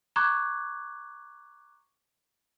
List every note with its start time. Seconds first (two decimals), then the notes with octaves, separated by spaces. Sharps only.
0.16 A#5 C#6 D6 F#6 G#6